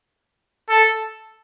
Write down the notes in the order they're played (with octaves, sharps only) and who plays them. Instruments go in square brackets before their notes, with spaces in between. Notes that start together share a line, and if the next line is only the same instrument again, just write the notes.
[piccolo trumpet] A4